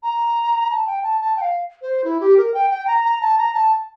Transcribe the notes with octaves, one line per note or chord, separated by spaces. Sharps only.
A#5
A5
G5
A5
A5
G5
F5
C5
E4
G4
A#4
G5
G5
A#5
A#5
A5
A#5
A5